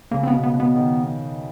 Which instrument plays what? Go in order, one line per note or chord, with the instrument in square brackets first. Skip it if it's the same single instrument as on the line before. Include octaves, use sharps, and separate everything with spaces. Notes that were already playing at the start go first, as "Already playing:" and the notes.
[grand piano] C#3 [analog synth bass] A#3
[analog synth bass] C4
B3
[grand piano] B2
[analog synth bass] B3
[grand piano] B2
[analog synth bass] B3
[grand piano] D#3